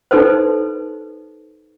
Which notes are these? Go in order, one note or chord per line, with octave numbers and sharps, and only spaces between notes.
D#4 A4 B4 C5